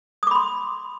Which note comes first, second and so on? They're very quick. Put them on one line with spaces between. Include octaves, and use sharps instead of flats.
D#6 D6 B5 C6